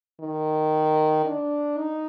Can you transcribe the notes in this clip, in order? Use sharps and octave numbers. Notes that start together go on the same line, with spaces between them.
D#3
D4
D#4